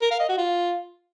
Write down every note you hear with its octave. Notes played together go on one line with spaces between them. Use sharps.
A#4
F5
D#5
F#4
F4